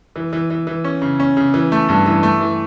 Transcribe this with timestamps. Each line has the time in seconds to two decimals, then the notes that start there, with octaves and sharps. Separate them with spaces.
0.16 E3
0.33 E3
0.50 E3
0.67 E3
0.84 C#4
1.02 C#3
1.20 C#4
1.37 C#3
1.54 E3
1.72 A3
1.89 G2
2.06 E3
2.23 A3
2.41 E3